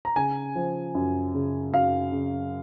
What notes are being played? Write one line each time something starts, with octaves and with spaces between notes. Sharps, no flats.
A#5
C#3 G#5
F3
F#2
C#3
F#2 F5
C#3